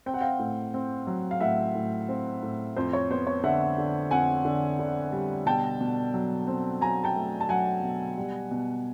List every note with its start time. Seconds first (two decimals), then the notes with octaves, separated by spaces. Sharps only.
0.06 C4 G5
0.14 F#5
0.21 F5 G5
0.39 A2
0.74 C4
1.07 F#3
1.31 F5
1.41 A2 E5 F#5
1.75 A2
2.09 C4
2.43 A2
2.76 F2 C5
2.93 C#5
3.10 B3 C5
3.27 C#5
3.43 D3 E5 F#5
3.78 D3
4.11 F2 F#5 G#5
4.45 D3
4.79 D3
5.12 G3
5.46 B2 G5 A5
5.81 B2
6.14 F#3
6.48 C4
6.81 F#3 G#5 A#5
7.04 G5 A5
7.15 A3
7.41 A5
7.49 F#3 F#5 G#5
7.83 B2
8.17 G3
8.51 B2